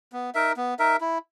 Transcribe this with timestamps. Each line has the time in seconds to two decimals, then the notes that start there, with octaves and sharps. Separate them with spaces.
0.13 B3
0.35 D#4 A#4 E5
0.57 B3
0.79 D#4 A#4 E5
1.01 E4